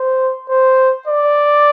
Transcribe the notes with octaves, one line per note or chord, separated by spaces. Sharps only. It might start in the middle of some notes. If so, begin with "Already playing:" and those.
Already playing: C5
C5
D5